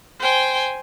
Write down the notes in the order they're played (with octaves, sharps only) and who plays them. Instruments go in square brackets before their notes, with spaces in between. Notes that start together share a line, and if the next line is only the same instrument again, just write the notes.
[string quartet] C5 G5 G#5